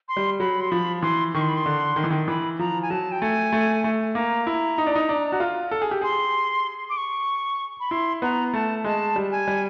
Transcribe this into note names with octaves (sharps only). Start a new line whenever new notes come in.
C6
G3
F#3 B5
C6
F3 B5
E3 C6
D#3 C#6
C6
B5
C6
D3
D#3
E3
D#3
E3 B5
F3 A#5
G#5
F#3 A5
G5
A3 G#5
A3
A3
A#3 A#5
E4
D#4
D4
D#4
D4
F#4
F4
A4
G#4
G4
G#4 C6
D6
C#6
B5
E4 C6
B3 A#5
A3 A5
G#3 A5
G3
G#5
G3